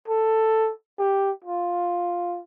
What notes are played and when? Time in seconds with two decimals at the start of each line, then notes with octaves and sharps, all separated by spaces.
0.08 A4
0.99 G4
1.44 F4